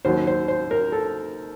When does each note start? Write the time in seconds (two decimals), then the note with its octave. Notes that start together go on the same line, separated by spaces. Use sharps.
0.05 D#2 D#3 F#3 C5
0.27 C5
0.48 C5
0.71 A#4
0.92 A4